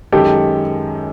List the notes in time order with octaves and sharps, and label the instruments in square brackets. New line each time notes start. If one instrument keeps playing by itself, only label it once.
[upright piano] F#2 D#3 G#3 [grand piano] G4 A4